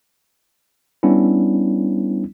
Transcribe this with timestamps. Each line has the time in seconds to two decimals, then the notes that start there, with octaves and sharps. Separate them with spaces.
1.03 G3 B3 C#4 D4 E4